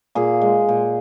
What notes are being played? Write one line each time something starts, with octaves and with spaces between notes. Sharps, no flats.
A#2 G#4
G#3
A#2